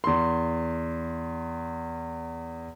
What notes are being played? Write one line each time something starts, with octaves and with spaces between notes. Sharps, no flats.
E2 C6